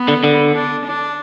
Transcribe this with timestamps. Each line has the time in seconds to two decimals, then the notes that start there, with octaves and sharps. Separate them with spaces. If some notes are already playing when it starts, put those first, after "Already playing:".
Already playing: B3
0.08 D3
0.24 D3
0.54 D4
0.85 D4